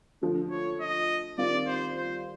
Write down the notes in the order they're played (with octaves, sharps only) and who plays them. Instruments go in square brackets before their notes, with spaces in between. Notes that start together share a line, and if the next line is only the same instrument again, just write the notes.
[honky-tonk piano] D3 F3 A3
[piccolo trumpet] C#5
D#5
[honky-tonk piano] D#3 G3 C4 F4 [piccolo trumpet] D5
[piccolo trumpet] C5
C5